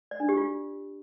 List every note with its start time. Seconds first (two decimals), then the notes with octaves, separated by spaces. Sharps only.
0.11 D5
0.20 D4
0.29 G4
0.37 F4